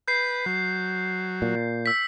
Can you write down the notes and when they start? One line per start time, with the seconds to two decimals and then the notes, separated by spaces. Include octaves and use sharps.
0.08 B4 G6 C7
0.46 F#3
1.42 A#2
1.86 E6 B6